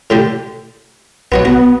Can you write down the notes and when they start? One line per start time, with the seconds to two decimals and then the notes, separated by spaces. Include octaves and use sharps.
0.10 A2 D3 G4
1.32 B1 B3 F#4 C#5
1.45 B3 F#4